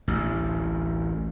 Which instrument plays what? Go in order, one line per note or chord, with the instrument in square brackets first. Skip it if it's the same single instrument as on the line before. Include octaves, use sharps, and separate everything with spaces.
[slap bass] A1 D2